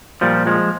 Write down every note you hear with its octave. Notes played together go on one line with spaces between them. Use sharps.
A#2 F3 G3
F3 G#3